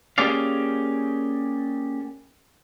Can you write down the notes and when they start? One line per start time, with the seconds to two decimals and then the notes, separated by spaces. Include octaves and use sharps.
0.18 A#3 C#4 G4 G#4 D5 F5